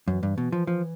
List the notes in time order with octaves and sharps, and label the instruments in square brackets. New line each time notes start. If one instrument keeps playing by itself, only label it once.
[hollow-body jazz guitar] F#2 [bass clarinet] E3
[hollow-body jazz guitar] G2
B2
F3
F3